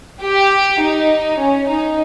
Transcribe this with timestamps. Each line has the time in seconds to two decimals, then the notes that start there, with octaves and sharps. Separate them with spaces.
0.23 G4
0.81 D#4
1.40 C#4
1.69 D#4